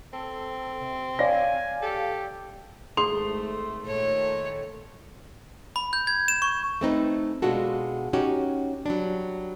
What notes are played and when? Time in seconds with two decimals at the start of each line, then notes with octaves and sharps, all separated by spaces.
0.13 C4 A4
0.81 C3
1.19 C#5 D5 F5 G#5 A#6
1.82 G4 A4
2.97 G#1 A3 G#4 C6
3.87 A#2 D#3 A3 C#5
5.76 B5
5.93 G6
6.07 G#6
6.28 E7
6.42 C#6
6.81 A3 C4 D#4 B4
7.42 B2 G#3 D4 F4 F#4 A4
8.13 C#4 D#4 F#4 G4
8.86 F#3 G3 D4